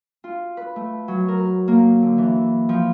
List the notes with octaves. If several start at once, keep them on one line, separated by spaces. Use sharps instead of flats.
F4
B4
A3
F#3
A#4
A#3
D3
E3
F3